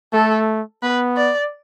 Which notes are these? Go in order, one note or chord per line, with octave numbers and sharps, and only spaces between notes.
A3 A4
B3 B4
D5